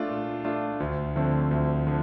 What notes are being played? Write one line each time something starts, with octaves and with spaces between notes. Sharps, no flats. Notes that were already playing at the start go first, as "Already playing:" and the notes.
Already playing: A3 D4 F4
A#2
A3 D4 F4
D2
D3 F3 A3 C4
D2
D3 F3